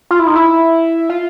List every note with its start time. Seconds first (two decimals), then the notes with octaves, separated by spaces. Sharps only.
0.11 F4
0.19 E4
0.27 D#4
0.35 E4
1.10 F4